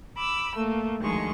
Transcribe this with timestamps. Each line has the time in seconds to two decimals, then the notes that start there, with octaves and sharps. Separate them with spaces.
0.18 B5 D6 E6
0.56 A3 A#3
1.01 D2 D#3 F3 G#3 C#6